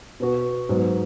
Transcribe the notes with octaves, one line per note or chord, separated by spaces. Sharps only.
B2 B3 F#4
G#2 F#3 B3